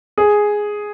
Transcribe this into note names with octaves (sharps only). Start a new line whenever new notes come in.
G#4